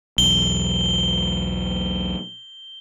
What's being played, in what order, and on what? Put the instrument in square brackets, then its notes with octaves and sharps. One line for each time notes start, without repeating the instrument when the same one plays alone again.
[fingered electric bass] B1 E2 [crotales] G7